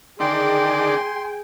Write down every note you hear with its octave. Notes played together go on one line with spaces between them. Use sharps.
D3 D#3 G#4 D5 G5 G#5 C6